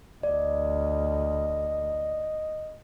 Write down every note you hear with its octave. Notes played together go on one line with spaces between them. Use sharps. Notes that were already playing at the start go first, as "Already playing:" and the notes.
D2 D5 D#5